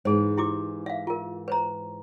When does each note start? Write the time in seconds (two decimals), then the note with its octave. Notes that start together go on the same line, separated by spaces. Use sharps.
0.05 G#2 E3 G#4 C5
0.38 E4 G4 D6
0.86 E5 F5
1.07 F4 A#4
1.48 B4 C5 A#5